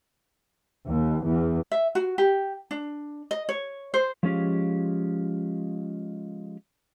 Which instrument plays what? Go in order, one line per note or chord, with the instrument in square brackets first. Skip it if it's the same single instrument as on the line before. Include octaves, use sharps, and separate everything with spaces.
[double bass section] D#2
E2
[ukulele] E5
F#4
G4
D4
D#5
C#5
C5
[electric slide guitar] F3 G#3 C#4 F4 G4